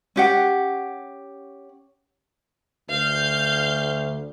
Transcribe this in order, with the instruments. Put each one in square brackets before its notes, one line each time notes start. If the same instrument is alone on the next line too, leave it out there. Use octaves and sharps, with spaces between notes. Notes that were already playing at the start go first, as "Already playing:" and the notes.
[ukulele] C#4 G4 F#5
[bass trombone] D2 [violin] F5 G6